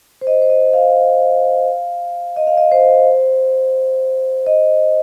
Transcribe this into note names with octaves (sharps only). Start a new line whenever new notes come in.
C5
D#5
C5
D#5
F5
D#5
F5
D#5
C5
D#5